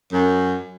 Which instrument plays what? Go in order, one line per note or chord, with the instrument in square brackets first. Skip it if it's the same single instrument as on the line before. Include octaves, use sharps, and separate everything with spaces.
[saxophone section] F#2